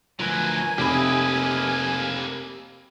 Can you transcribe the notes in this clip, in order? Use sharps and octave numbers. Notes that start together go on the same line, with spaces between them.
D2 F3 F#3 A#4 B4 G#5
F1 A#3 G4 B4 D#5 E5 B5